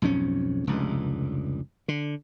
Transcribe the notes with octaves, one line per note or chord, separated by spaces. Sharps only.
B1 F2 G#2 C#4
F1 C#2 G2
D3